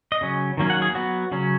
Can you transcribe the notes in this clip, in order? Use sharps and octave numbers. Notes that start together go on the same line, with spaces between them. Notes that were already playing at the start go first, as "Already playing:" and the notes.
D#5
C#3 F#3 C#4
D#3 F#3 A#3 C#4
F#5
G#4
F#3 B3 F#4
C#3 F#3 C#4